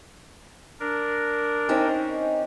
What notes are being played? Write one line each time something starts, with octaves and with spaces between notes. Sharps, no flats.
D4 A#4
C4 C#4 D#4